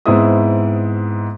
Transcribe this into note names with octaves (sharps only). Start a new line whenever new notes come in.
G#2 B3 C4 E4 E5 D#6